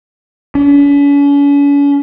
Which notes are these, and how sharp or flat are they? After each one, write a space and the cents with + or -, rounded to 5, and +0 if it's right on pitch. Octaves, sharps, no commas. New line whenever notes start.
C#4 +45